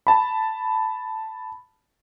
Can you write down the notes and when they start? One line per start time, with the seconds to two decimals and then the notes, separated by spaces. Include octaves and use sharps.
0.07 A5 B5